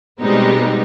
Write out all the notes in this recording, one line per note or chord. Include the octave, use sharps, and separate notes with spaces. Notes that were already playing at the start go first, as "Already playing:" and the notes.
B2 G3 G#3 B3 C4 D#4